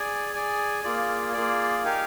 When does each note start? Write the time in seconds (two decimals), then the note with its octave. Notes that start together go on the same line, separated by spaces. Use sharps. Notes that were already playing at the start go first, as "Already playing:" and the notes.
Already playing: G#4 D5 G#5
0.33 G#4 D5 G#5
0.83 A#3 F4 G#4 D5
1.33 A#3 F4 G#4 D5
1.84 D#4 G4 A#4 F5 G#5